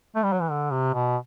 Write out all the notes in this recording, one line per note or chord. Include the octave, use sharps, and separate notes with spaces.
A3
G3
F#3
E3
D3
C3
B2